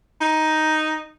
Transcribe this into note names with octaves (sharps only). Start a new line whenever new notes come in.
D#4